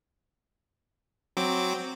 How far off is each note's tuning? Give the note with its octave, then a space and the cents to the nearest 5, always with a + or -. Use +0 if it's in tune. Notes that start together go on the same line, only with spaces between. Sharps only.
F#3 +0 C4 +0 D6 +0